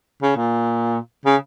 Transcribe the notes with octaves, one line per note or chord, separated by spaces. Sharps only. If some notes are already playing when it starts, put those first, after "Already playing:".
C#3
A#2
C#3